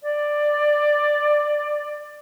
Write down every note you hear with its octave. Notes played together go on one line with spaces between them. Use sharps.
D5